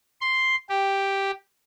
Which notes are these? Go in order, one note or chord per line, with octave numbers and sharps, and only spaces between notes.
C6
G4